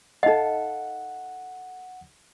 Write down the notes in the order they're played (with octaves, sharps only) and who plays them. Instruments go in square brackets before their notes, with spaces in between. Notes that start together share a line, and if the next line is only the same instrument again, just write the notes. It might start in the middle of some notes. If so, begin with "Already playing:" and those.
[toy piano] D#4 D#5 [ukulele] A4 F5 [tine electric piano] F#5